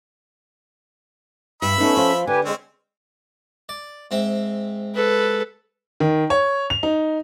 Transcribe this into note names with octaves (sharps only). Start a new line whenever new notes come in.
G2 E5 B5
A3 B3 C#4 D#4 B4
F3 F4
D3 G4 B4 G#5
G#3 C4 C#4
D5
G#2 C4 E5
A4 B4
D#3
C#5
F7
D#4